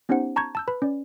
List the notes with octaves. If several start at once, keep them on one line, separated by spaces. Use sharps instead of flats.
B3 C#4 D#4 G4 C5 F#5
A5 A#5 C#6 G6 G#6
A5 E6 G6
B4 B5
C#4 D5